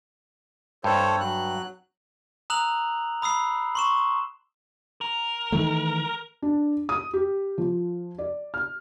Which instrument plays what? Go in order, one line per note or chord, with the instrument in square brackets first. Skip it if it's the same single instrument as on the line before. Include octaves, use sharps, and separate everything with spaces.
[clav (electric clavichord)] G2 [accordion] A4 C5 C#5
[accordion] F#3 F#6
[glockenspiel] A#5 D#6 E6 F#6 F7 F#7
B5 D#6 E6 C7
C6 C#6 E7
[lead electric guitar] A#4
[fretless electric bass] D#3 E3 A3
[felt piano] D4
D#6
G4
F3
D5
F6